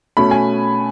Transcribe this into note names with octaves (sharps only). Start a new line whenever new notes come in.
B2 A3 C#4 B5
G#5